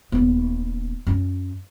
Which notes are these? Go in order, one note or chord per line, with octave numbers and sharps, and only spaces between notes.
D#1 B3
F#2 C#4